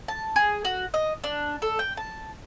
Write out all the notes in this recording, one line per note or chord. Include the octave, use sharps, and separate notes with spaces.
A5
G#4
F#4
D#5
D4
A4
G5
A5